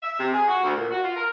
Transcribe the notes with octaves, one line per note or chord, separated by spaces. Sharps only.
E5
C3
G#4
F#4
D2
A#2
F#4
F4
A#4